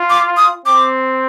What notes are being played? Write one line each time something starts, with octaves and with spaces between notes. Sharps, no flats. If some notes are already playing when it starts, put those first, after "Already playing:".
Already playing: F4
D6
D#6
C4 D6